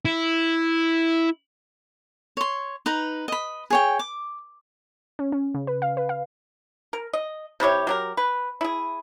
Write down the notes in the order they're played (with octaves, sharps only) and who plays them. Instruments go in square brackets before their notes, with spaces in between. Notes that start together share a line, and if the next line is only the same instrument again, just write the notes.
[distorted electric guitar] E4
[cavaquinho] C#5 C6
D#4 B4 A#5
D#5 B5
G#4 C#5 G5
D6
[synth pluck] C#4
C#4
C#3
B4
F5
B4
F5
[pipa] A#4
D#5
C3 E4 G4 C#5
F#3 G4 A#4
B4
E4 G#4